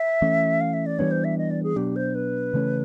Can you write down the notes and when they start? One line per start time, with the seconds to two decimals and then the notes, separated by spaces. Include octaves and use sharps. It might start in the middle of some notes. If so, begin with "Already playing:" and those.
Already playing: E5
0.22 E3 A3 C#4
0.61 F5
0.73 E5
0.86 D5
0.99 E3 G3 B3 D4 C#5
1.11 C5
1.24 E5
1.38 D#5
1.50 D5
1.63 G#4
1.76 B2 F#3 B3 D4 G4
1.96 C5
2.15 B4
2.54 C#3 E3 A3 C#4